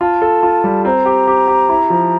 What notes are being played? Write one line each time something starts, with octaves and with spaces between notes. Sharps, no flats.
F4 A5
A4
F4
G3
C4 A#5
G4
G4
G4
E4
F3